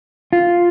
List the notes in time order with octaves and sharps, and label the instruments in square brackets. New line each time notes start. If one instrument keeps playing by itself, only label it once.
[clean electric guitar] F4